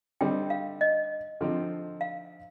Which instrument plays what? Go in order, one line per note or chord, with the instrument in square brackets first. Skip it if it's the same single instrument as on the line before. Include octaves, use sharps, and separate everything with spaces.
[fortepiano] D3 G3 C4 D#4 [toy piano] G5
[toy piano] F5
D#5
[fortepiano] D3 F3 C4 D#4
[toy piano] F5